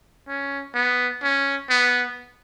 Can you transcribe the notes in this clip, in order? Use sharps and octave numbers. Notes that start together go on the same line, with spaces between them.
C#4
B3
C#4
B3